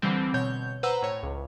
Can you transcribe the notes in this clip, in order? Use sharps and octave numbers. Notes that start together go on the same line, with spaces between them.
D3 E3 G3 C4
B2 C#5 G6
B4 C5 F#5 A#5 E6
A2 C#5
C#2